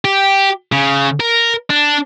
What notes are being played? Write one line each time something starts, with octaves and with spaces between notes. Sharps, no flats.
G4
C#3
A#4
D4